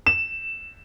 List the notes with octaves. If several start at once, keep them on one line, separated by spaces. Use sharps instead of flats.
E7